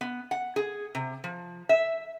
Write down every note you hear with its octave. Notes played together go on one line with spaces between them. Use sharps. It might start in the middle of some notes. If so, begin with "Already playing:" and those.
B3
F#5
G#4
C3
F3
E5